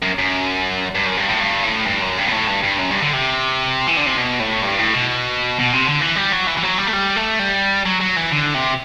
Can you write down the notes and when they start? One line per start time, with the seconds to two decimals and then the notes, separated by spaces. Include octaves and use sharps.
0.03 F#2
0.19 F#2
0.95 G2
1.06 F#2
1.17 G2
1.29 A2
1.40 G2
1.63 A2
1.87 G2
2.02 F#2
2.18 G2
2.28 B2
2.32 A2
2.48 G2
2.63 G2
2.79 F#2
2.90 G2
3.01 D3
3.13 C3
3.87 E3
3.97 D3
4.06 C3
4.17 B2
4.40 A2
4.63 G2
4.78 A2
4.94 B2
5.60 B2
5.73 C3
5.87 D3
6.02 E3
6.17 G3
6.32 F#3
6.47 E3
6.57 E3
6.63 F#3
6.78 G3
6.87 A3
6.93 G3
7.16 A3
7.39 G3
7.85 F#3
8.00 F#3
8.16 E3
8.31 D3
8.54 C3